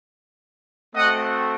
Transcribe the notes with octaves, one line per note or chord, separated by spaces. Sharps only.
A3 C4 F#4 D#5 F#5